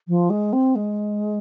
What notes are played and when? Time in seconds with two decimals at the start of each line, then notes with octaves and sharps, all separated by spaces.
0.08 F3
0.30 G#3
0.52 C4
0.75 G#3